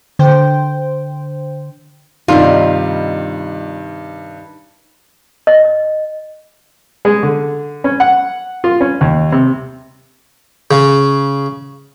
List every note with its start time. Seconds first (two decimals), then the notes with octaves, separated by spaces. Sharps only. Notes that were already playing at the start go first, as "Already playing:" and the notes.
0.19 D3 C5 G5
2.28 G2 C3 D#3 G3 D4 D#4 F4 G4
5.47 D#5
7.05 G#3
7.23 D3
7.84 C#4
8.00 F#5
8.64 F4
8.81 C#4
9.01 D#2
9.32 C3
10.71 C#3